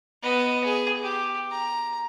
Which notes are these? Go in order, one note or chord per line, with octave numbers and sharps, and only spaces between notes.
B3 D#5
G#4
G4
A#5